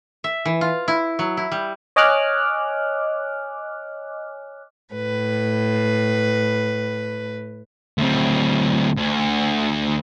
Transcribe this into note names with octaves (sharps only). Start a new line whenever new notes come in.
E5
E3
F4
E4
F#3
E4
G3
C#5 D#5 G#5 D6 F6 F#6
A2 B4
D2 C4
D2